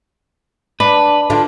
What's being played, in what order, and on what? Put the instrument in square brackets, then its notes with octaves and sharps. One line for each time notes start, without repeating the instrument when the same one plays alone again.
[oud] D4 [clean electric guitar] B4
[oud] D3 D4 F4